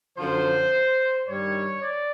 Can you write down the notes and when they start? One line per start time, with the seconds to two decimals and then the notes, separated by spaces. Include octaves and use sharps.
0.17 F#2 D3 F3 C5
1.27 G2 D#3 G3 C#5
1.82 D5